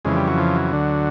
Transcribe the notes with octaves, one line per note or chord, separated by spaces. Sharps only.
F2 C#3 E3 G#3
G3
F#3
F3
F#3
D2 D3